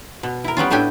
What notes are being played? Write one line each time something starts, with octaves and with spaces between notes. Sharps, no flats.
B2
E4 A#4
G3 B3 C#4 F4
A2 A3 D4 G4 G5 G#5